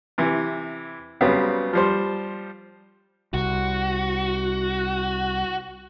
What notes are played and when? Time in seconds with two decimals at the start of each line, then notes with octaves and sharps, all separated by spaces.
0.18 C3 E3
1.21 C#3 F#3 G3 B3 C4
1.73 F3 G3 C5
3.34 C2 F#4